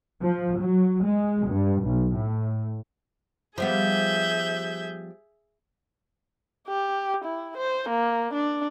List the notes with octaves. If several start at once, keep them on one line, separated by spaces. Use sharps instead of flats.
F3
F#3
G#3
G2
B1
A2
F3 G3 B3 G#4 E5 G6
G4
E4
C5
A#3
D4